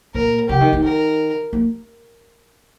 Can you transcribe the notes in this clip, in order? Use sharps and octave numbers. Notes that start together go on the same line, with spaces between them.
A#2 A#4
C3 G4
D#3
D#3
A#4
A#3